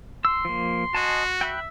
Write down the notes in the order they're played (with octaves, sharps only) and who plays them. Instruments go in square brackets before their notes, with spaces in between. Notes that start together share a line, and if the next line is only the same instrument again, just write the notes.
[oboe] C6 [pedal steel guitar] E6
[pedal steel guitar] F3 A#3
[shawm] F#4 [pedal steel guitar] D#5 G#5 A5
[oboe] E5 [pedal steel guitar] G5 B5 F#6